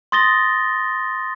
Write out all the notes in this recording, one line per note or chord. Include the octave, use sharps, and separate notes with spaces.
C6 D#6 A6 A#6 G7